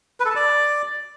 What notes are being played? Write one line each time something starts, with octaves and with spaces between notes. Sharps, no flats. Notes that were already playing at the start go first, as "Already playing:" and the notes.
B4
A4
A5
D5